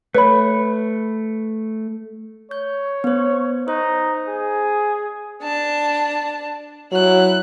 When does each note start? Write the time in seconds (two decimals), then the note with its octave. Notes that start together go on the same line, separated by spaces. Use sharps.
0.15 A3 B4 C#5 B5
2.51 C#5 G6
3.04 B3 C5
3.68 D#4 C5
4.28 G#4
5.43 D4 A5
6.92 F#3 E4 F#6